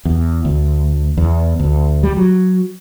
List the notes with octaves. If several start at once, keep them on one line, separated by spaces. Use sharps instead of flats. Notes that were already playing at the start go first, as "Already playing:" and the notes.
E2
D2
E2
D2
G3
F#3